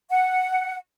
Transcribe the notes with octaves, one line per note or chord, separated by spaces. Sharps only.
F#5